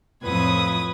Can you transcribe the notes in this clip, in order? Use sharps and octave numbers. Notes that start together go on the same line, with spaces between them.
F2 A2 B4 D#6 G#6